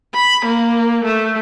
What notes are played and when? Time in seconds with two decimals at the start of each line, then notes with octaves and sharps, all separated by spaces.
0.14 B5
0.45 A#3
1.05 A3